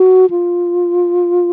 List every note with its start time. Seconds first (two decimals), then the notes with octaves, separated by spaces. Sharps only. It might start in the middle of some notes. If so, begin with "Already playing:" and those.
Already playing: F#4
0.30 F4